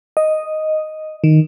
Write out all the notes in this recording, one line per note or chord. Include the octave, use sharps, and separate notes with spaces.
D#5
D#3